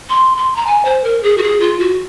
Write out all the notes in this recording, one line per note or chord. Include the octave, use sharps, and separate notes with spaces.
C6
C6
A#5
G#5
C5
A#4
G#4
F#4
G#4
F4
F#4